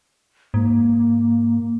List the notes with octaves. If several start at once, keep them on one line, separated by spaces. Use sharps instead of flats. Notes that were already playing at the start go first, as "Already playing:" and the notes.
G#2 A#3